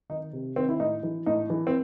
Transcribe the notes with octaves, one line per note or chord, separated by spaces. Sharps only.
D#3 D#4
C3
D#3 C4
E4
A2 D#4
E3
A2 D#4
E3
C4